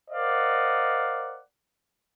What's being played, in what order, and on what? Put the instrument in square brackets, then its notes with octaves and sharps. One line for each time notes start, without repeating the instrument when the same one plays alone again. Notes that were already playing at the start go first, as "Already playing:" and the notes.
[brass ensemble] A#4 C5 D5 D#5 F5 F#5